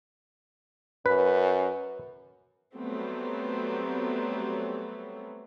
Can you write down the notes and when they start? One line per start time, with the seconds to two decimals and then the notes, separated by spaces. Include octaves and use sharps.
1.06 F#2 B4
2.73 F#3 G3 A3 B3 C4